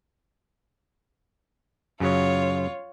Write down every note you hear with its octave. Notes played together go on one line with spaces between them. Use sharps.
F#2 C#3 F#3 F4 C#5